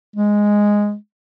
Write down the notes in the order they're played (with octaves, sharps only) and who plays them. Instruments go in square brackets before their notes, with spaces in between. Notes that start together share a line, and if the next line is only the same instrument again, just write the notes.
[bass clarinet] G#3